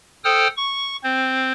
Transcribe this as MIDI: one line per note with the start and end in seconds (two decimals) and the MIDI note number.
0.24 0.48 69
0.24 0.48 72
0.24 0.48 79
0.24 0.48 87
0.24 0.48 89
0.57 0.96 85
1.04 1.52 60
1.04 1.52 72